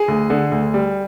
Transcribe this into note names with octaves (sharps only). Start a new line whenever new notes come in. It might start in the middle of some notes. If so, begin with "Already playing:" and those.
Already playing: G#4
D2
D3
D2
G3